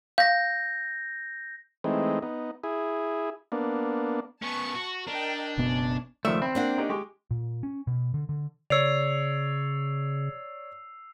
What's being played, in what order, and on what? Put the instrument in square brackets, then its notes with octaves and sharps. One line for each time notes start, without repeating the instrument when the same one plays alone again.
[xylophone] F5 [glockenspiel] G6 A#6
[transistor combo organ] E3 G#3 A3 C4 D#4
B3 D#4
E4 G#4
A#3 B3 D4
[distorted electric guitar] B3 C#4 [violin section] A5 C#6
[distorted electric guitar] F#4
[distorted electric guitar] D4 [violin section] A#4 D#5 G5
[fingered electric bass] F#1 B2 B3 [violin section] C#4
[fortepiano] C#2 D#3 D5 [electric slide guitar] F3 A3 [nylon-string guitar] E5
[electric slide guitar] C4 [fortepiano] B5
[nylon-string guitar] A#3 D4 F#5
[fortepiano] C#4 D#4 G4
G#3 G4 C#6
[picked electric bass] A#2
C#4
B2
D3
D3
[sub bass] C#3 [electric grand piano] C#5 D5 [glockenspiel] E6 C7 F7